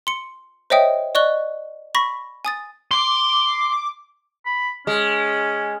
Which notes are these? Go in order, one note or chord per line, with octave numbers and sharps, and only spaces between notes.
C6 C#7
C5 C#5 D#5 E5 G5 D#6
D5 D#5 C#6 F#6 G7
B5 C#6 A#6 B6
G#5 D#6 A6
C6 D6
B5
G#3 C#4